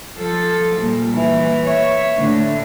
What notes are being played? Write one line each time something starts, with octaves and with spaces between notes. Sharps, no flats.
F3 A4
A#2 G3
E3
C#5 E5
A2 D3